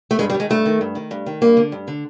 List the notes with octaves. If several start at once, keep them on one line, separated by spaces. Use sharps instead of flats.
A3
G2 G#3
G3
D#3
G#3
G2 A3
D#3
G2
D#3
G2
D#3
G2 A#3
D3
G2
D3